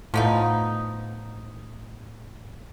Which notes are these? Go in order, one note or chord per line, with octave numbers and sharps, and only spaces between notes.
A2 F3 B3 D#4